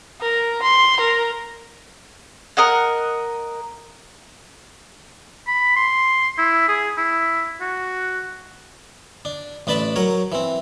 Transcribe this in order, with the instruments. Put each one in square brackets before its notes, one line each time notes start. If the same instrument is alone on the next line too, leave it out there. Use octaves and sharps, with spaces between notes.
[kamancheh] A#4
C6
A#4
[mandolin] A#4 D#5 F#5
[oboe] B5
C6
E4
G#4
E4
F#4
[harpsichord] D4
A1 D4 B4 D5 A5 B5
F#3 A#4 C#5
E3 C4